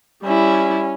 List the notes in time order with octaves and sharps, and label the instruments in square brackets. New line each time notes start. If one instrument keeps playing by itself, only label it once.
[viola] G3 E4 [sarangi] C#4